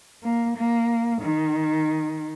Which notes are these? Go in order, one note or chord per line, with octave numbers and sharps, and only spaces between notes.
A#3
A#3
D#3